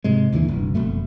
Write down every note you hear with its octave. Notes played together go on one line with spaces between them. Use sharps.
G#2 C3 G#3
D#2 A#2 D3 E3
F1 D2 G2
F#1 F2 B2 A3